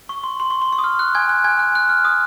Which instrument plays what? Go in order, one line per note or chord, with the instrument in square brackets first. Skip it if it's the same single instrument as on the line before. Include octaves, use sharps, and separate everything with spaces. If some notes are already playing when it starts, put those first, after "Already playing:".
[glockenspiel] C#6
C6
C6
C#6
C6
C#6
D#6
F6
F#6
G#5 G#6
F#6
G#5 G#6
F#6
F#6
F6
D#6